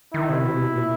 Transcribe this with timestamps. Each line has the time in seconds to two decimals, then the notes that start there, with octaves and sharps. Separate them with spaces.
0.13 D#3 E4
0.29 C3
0.44 B2
0.52 C3
0.59 B2
0.74 A#2